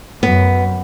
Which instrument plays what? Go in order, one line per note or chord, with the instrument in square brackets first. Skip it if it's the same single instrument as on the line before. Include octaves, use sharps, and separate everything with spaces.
[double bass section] F#2 [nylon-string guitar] B3